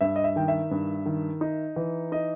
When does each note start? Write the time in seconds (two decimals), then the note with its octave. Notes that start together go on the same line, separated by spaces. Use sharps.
0.01 G2 E5
0.16 D#5
0.24 E5
0.36 D#3 G5
0.48 E5
0.71 G2
1.06 D#3
1.41 D#4
1.76 E3
2.12 D#4 D#5